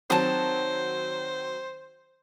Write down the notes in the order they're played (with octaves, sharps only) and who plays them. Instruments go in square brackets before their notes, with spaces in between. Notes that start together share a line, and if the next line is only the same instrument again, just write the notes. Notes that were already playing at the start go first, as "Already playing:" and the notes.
[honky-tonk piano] D#3 F#3 C4 [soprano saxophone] C5 [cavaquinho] A5 D#6